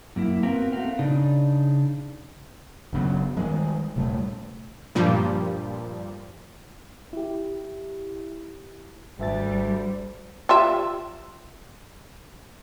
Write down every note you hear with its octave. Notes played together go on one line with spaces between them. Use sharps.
F#2 A#3 E4
B3 C4 F#4 A#4 B4 F5
A3 C4 F5 F#5
C#3 D4 D#4
F#1 C#3 F#3 B3
D#3 E3 G3 G#3
D#1 C3 G3 A3
G2 A#2 F3 G3
E4 G4
G#1 D2 G3 E5 A6
F4 G4 E5